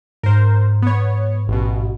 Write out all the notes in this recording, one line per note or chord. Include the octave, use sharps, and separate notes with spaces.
G#2 A#4 C5
B3 C#5
A1 B2